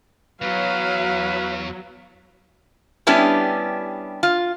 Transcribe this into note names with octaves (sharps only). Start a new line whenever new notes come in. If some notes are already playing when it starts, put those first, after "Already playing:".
E2 F#3 B4 F5
G3 B3 C#4 D4 E4 G4
F4